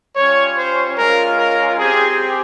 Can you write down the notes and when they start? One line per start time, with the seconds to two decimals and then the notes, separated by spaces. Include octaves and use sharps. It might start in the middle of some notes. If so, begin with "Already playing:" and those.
0.16 G3 C#4 F4 C#5
0.56 C5
0.98 G#3 C#4 F4 A#4
1.38 A#4
1.78 C4 G4 G#4